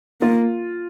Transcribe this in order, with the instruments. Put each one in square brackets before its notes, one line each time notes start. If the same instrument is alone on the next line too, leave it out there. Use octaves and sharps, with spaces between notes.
[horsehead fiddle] A#3 [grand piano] F4